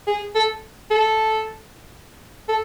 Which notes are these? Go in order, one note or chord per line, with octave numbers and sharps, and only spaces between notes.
G#4
A4
A4
A4